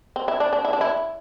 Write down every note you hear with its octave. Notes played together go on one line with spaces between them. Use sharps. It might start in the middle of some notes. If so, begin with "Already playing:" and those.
C4
E4
D4
D4
E4
D4
E4